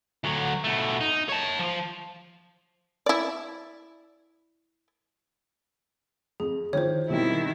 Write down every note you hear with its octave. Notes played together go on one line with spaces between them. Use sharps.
D2 F#3
B2 A3
D#4
C#5 A5
F3
E4 D5
F2 G#4
D#3 F3 E4 C5 C#5
B2 D#3 G3 C4 E4